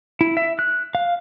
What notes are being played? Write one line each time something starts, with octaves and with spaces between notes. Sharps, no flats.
E4
E5
F#6
F5